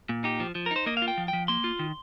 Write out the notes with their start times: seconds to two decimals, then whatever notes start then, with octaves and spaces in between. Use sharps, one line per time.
0.09 A#2
0.24 D#4 G4
0.40 F3
0.55 F3
0.66 A#4
0.71 D#4 C5
0.86 A#3 D#5
0.97 F5
1.02 F4
1.08 G5
1.18 F3
1.28 G5
1.33 F3
1.48 A#3 C6
1.64 F4
1.79 D#3